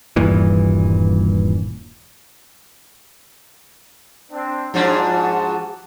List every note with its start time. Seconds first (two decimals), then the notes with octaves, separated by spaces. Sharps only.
0.16 D#1 G2 A#2 E3
4.31 C4 D4
4.74 G#2 F3 D4 F#4 A5